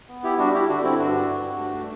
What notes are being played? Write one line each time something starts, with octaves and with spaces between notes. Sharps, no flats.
B3
E4 G4
G3 D4 F#4
E4 G4
D3 D4 F#4
C4 E4
G2 D4 F#4
G2
A3